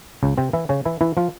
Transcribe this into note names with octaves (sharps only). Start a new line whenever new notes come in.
C#2 C#3
C3 C4
E3 E4
C#3 C#4
E3 E4
E3 E4
F3 F4